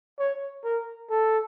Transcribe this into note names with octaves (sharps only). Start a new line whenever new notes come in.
C#5
A#4
A4